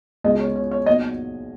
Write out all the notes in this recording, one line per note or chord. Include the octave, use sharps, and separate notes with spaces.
C#2 B2 G#3 D#5
C#5
C#5
C#5
B1 A#2 F#3 D#5